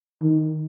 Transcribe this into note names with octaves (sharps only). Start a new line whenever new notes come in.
D#3